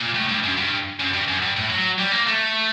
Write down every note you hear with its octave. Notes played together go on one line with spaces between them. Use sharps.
A#2
A2
G2
F#2
G2
F#2
G2
F#2
G2
A2
F#3
G3
A#3
A3